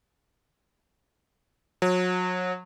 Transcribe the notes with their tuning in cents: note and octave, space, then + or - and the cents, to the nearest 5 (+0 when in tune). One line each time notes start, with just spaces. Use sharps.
F#3 -30